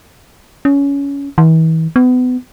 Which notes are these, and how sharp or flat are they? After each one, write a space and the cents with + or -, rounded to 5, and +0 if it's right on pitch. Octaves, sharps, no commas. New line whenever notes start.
C#4 +20
E3 -40
B3 +30